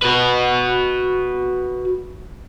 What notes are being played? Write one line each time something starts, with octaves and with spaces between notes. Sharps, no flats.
F#4 B4